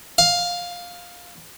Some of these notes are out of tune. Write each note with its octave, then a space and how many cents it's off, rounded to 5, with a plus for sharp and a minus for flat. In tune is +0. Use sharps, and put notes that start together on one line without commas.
F5 +10